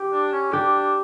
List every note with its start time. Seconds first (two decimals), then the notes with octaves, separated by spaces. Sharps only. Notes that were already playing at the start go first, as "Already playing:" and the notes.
Already playing: G4
0.13 D4
0.33 C#4
0.52 D4 G4